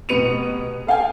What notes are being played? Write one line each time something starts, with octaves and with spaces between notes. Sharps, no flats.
F1 B2 B4 C#7 D#7 F7
A4 F5 G5 G#5